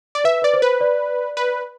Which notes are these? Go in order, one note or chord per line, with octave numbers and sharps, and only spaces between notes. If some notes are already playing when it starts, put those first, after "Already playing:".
D5
B4 E5
B4 D5
C5
B4
D5
B4